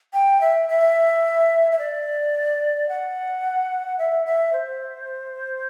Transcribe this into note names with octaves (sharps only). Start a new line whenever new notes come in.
G5
E5
E5
E5
D5
F#5
E5
E5
C5